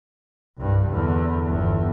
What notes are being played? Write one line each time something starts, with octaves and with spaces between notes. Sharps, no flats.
C2 G2
E2 D3
G1 E2